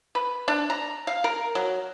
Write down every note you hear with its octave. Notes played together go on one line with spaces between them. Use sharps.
B4
D4
A#5
F5
A#4
F#3